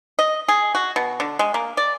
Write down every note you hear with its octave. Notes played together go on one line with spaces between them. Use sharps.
D#5
G#4
F#4
B2
D3
G#3
A#3
D5